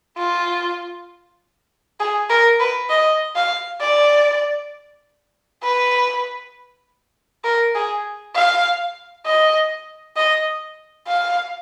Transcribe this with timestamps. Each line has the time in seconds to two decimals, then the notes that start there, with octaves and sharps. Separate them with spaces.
0.18 F4
2.00 G#4
2.30 A#4
2.60 B4
2.90 D#5
3.36 F5
3.81 D5
5.63 B4
7.44 A#4
7.75 G#4
8.35 F5
9.26 D#5
10.17 D#5
11.07 F5